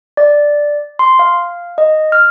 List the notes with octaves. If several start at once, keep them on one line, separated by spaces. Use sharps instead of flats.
D5
C6
F5
D#5
F6